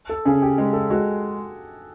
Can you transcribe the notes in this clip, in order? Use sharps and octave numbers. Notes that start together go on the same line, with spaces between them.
A4
C#3 G#4
G4
G#3
A4
G#3 F#4